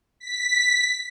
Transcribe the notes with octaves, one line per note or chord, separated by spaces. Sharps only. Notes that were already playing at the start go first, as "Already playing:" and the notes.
B6